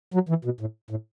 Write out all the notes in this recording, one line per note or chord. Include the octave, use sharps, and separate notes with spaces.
F#3
E3
B2
A2
A2